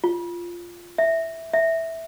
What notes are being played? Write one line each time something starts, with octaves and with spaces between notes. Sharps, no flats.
F4
E5
E5